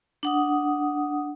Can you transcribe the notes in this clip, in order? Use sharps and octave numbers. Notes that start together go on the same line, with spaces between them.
D4 F#5 D#6